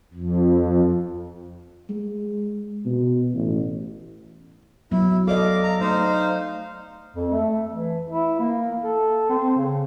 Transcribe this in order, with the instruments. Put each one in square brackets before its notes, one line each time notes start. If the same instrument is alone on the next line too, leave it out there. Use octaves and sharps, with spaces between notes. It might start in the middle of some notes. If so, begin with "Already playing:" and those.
[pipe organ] F2
[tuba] G#3
B2
A1
[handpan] F#3 B3 [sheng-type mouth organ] E4
[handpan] A4 D5 D#5 [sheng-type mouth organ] F5 D6
[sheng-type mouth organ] A#5
[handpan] A3 [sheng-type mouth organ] D#4 C5 F5
[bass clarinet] F2
A3
E3
E4
A#3
A4
C4
C#3